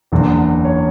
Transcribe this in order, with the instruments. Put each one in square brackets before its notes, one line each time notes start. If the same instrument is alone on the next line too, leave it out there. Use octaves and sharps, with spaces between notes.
[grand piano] F#1 E2 D3
C#5